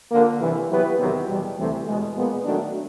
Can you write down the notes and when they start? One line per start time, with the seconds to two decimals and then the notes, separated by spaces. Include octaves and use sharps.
0.11 D3 F3 A#3
0.40 C2 C3 E3
0.70 F#3 B3 E4 G4 B4
0.99 E2 C3 D#3 F#3 B3
1.28 E2 B2 G3
1.58 D2 C3 E3 A3 C4
1.87 E2 B2 G#3
2.16 A#2 F3 G#3 B3
2.45 D#3 F#3 A3 D4 F#4